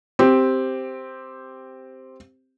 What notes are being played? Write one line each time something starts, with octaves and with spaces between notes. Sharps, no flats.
C4 G4